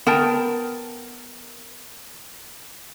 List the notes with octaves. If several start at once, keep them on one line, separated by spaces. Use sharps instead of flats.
B3 A#4 G5 A5